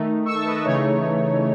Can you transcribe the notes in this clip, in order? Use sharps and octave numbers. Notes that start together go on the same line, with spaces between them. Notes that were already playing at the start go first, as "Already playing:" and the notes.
Already playing: D#3 A3 D#4
C#6 E6
A5 C#6
B4 D#5
B4
C#3 E3 A3 D#4 C#5